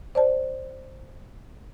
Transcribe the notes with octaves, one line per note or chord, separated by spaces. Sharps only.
C5 D5 A5